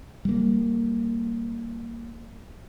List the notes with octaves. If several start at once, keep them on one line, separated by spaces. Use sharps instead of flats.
G3 A#3